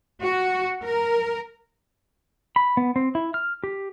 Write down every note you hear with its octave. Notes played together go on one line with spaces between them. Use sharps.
F#4
A#4
B5
B3
C4
E4
F6
G4